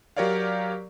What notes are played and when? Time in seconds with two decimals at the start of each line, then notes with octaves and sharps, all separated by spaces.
0.17 F#3 G4 A#4 C#5 D5 F5